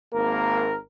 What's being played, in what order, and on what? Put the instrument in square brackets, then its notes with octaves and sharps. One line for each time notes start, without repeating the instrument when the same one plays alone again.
[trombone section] G#1 A#4 [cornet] A#3